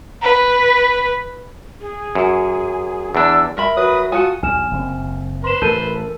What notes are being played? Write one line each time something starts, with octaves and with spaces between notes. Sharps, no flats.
B4
G#4
F#2
E2 D4 E6
A#4 E5 B5
F#3 B4 D#6
F4 F#4 A4 G#5 D#6
B1 E2 G#5 F6 E7
F#1 C#3 C4
B4 C5 C6 E7
A1 A4 A#4 G6 D#7